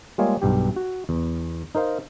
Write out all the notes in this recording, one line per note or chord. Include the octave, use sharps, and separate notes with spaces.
G3 G#3 A#3 F4 G#4 C#5
B1 G2 G4
F#4
E2
D#4 A#4 C5 F5